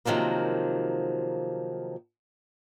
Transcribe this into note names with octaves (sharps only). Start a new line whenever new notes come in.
C3 D#3 F3 F#3 A#3